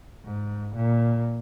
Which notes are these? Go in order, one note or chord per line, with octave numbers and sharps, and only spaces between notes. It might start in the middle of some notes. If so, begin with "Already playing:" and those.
G#2
A#2